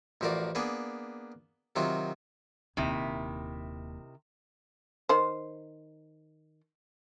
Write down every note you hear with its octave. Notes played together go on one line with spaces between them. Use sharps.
A1 F3 F#4 A#4 D5 F5
A#3 B3 D4 G#4 B4
C3 D#3 F#3 F4 F#4
D#1 D#2 C3 D#3 E4
D#3 C5